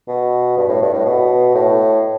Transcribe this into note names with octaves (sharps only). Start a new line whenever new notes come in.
B2
G2
A2
G2
A2
B2
A2